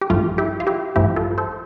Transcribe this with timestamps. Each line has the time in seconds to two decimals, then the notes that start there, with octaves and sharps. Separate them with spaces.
0.01 G4
0.10 A1 G2 F3 A3 F4
0.38 E4 G4
0.60 F4
0.67 E4 G4
0.96 A1 G2 F3 A3 E4 G4
1.16 F4 A4
1.38 A4 C5